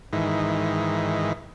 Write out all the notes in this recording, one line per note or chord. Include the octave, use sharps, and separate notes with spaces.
G#2 D#3 E3